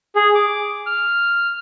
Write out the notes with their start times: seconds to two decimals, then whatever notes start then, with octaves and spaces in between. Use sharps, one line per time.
0.15 G#4
0.35 D6
0.86 F6